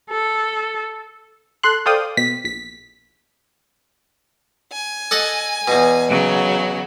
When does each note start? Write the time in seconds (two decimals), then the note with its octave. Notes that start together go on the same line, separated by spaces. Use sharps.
0.10 A4
1.63 A4 C6 F#6
1.86 A4 C5 D5 F5 G5 D#6
2.17 B2 B6
2.45 A#1 B6
4.71 G#5
5.11 A4 D#5 F#5
5.68 E2 B2
6.09 C#3 F#3 F#4